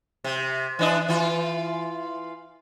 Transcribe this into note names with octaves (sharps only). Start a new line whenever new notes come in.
C3
E3 D4 D#5
E3 F4